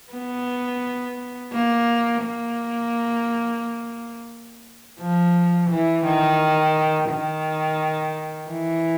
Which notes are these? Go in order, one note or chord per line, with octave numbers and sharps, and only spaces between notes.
B3
A#3
A#3
F3
E3
D#3
D#3
E3